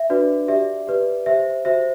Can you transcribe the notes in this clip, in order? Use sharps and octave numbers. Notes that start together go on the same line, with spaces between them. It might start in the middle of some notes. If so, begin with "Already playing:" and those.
Already playing: E5
D4 F#4 B4 D5
G4 D5 E5
G4 B4 D5
G4 C5 E5
F#4 C5 E5